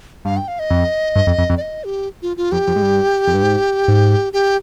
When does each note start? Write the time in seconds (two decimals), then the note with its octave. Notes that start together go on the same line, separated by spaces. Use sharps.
0.25 G2 F5
0.37 G5
0.48 F5
0.59 D#5
0.70 F2
1.16 G2
1.27 F2
1.38 F2
1.50 F2
1.57 D5
1.61 D#5
1.84 G4
2.22 F4
2.37 F4
2.52 F2 G4
2.67 F2
2.76 G#2
2.82 G2
3.27 F2
3.34 G2
3.43 G#2
3.88 G#2
4.33 G4